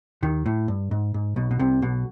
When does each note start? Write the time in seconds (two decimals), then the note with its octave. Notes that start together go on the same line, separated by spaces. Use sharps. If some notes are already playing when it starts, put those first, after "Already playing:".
0.23 D#2 D#3
0.46 A2
0.68 G2
0.91 G#2
1.14 G#2
1.36 B1 B2
1.51 B2
1.59 C2 C3
1.82 B1 B2